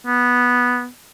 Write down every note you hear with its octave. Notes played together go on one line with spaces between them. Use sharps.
B3